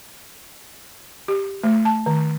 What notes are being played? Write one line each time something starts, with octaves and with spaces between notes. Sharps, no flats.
G4
A3
A5
D#3